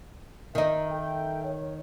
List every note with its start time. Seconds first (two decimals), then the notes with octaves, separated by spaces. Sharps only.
0.55 D#3 D#4 E5
0.89 A4 E5 G5
1.45 C#5